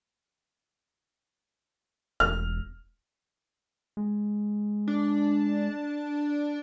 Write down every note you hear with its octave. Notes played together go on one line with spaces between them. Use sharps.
E1 F6
G#3
D4